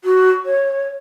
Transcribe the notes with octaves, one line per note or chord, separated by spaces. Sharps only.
F#4
C#5